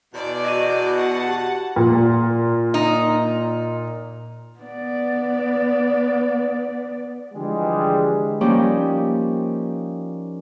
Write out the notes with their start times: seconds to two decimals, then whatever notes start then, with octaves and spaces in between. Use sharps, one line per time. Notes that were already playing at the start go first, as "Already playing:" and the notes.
0.14 E2 B2 D5
0.45 F#4 D#5 D#7
0.97 F#5 A5
1.28 G4
1.76 A#2
2.74 D#4
4.59 B3 D5
7.33 D3 E3 F3 G3 G#3
8.41 F3 G3 A#3 C#4 D#4 G4